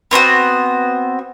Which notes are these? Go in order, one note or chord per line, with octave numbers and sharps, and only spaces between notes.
B3 C4 D4 F#4